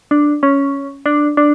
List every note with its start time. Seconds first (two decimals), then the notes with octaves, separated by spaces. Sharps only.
0.11 D4
0.43 C#4
1.06 D4
1.37 D4